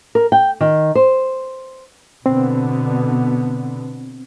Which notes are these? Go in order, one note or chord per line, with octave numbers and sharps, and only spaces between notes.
A#4
G5
D#3
C5
B2 D3 B3 C4